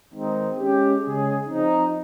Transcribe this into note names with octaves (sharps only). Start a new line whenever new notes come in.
D#3 G#3 C4 D#4
G#3 C#4 G4
C#3 G#3 C#4 G#4
F3 C4 D#4